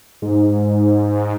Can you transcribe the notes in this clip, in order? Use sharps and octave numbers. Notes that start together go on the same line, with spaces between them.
G#2